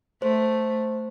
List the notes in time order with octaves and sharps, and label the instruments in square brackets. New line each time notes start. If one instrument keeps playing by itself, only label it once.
[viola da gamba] A3 [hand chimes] C5